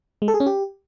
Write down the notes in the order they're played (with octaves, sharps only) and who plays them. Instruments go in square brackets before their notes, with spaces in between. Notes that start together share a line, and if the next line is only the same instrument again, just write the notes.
[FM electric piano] G#3
A4
G#4
C#4
G4